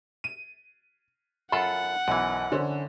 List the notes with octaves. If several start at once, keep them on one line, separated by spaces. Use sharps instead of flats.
D#7
F#2 F4 A4 F#5 B5
B1 F#2 E3
D3 C#4 C5